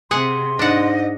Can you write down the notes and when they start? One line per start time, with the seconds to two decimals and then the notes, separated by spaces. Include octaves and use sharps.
0.11 C3 G#4 F#5 G#5 C6
0.59 G#2 D4 D#5 F#5